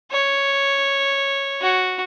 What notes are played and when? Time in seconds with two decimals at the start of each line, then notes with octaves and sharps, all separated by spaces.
0.11 C#5
1.61 F#4